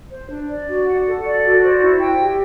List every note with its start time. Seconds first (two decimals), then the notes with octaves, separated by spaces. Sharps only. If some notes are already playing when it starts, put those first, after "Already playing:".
0.10 C5
0.30 D4
0.49 D5
0.68 F#4
0.87 F#5
1.06 A4
1.24 D5
1.43 F#4
1.62 C5
1.80 E4
1.99 G5
2.19 G4